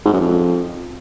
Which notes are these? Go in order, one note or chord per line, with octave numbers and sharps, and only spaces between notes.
G#2
F#2
F2